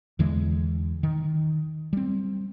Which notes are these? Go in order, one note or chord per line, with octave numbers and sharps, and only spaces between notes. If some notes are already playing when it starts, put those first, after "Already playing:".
E2 D3 E3 G#3
D#3
G3 C4